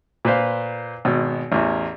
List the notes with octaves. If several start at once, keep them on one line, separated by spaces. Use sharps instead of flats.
A#2 B4 C5 F5
G#1 B2
A1 E2